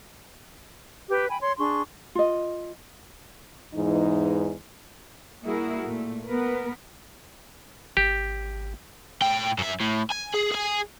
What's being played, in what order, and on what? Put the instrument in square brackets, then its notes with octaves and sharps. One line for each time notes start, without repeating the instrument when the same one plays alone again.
[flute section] G4 B4
G5 G#5 B5
C#5 C6
D4 G#4 C6 C#6
[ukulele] F4 D#5
[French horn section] E2 G#2 E3 D#4
[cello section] G3 A#3 E4 F#4 G#4 A#4
A#2 A3
B3 A#4 B4
[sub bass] G#1 [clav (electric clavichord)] G4
[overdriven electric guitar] A2 G5
F#2 E5
A2
G#5
G#4
G#4 G#5